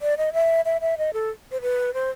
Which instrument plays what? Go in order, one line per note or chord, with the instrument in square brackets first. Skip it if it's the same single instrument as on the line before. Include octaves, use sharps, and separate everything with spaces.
[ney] D5
D#5
E5
E5
E5
D#5
A4
C5
B4
C5